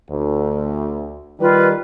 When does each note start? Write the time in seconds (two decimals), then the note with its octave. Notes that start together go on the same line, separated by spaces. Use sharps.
0.11 D2
1.40 D#3 G3 F4 B4